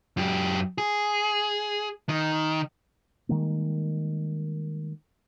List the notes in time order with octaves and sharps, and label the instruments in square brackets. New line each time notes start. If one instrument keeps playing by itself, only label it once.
[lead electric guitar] F#2 G4
G#4
D#3
[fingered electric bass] D#3 G3 G#3 A#3